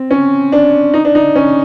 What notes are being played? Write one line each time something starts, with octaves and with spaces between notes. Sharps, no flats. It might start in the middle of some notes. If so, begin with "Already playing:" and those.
Already playing: C4
C#4
D4
D#4
D4
D#4
C#4